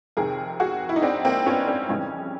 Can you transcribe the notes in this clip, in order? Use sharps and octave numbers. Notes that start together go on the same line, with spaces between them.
F2 C3 D#3 G#4 A#4
F#4 G#4
E4
D#4
C4 D4
A#3 C4
B3 C#4
C4 D4
F2 C#3 E3 G3 C#4 D#4